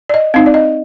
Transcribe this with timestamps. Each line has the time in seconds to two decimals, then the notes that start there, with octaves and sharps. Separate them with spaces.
0.09 D5
0.14 D#5
0.34 C4 D#4 F5
0.46 D5
0.54 D#5